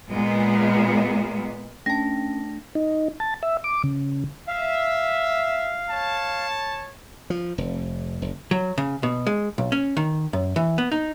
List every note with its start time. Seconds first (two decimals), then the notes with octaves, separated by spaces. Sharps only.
0.10 A#2 G#3 B3
1.86 A3 C#4 D4 G5 A5 A#6
2.75 D#4
3.20 A5
3.43 E5
3.64 D6
3.84 C#3
4.48 E5 F5
5.90 C#5 A5
7.30 F3
7.58 F1
8.22 F#1
8.51 F#3
8.78 C#3
9.03 B2
9.27 G#3
9.58 B1
9.72 C#4
9.97 D#3
10.33 F#2
10.56 E3
10.78 B3
10.92 D#4